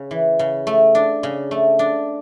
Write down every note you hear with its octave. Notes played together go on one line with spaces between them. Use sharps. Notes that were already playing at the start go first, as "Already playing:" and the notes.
Already playing: C#3
E3
C#3
A3
D4
C#3
A3
D4